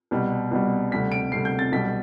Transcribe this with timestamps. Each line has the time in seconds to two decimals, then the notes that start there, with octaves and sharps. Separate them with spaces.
0.11 C2 B2 G3
0.51 C2 B2 G3
0.91 D2 C3 G3 B6
1.12 D7
1.32 D2 C3 G3 C7
1.45 G6
1.59 A6
1.72 B1 B2 G3 B6